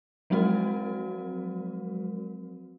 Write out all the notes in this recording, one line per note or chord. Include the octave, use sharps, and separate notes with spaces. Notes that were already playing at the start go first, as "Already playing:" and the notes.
F3 F#3 G#3 C4 F#4 A#4